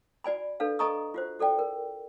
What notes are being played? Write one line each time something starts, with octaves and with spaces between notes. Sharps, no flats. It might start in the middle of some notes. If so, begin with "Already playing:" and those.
F#4 D5 G#5 B5
D4 A4 B4 F5
A4 D#5 G#5 A#5 C#6 D#6
F4 F#4 C5
F#4 A4 D5 G5
A#4